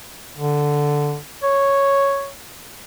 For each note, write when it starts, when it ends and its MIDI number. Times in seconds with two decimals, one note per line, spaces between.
0.37 1.18 50
1.43 2.30 73